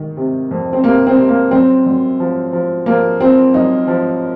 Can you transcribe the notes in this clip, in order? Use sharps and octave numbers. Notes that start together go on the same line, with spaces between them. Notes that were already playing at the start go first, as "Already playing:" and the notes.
Already playing: D#3
C3
F2
C4
C3 A#3
C4
C3
A#3
F#2 C4
F#2
F3
F3
F3 A#3
F3 C4
F#2 D#4
F3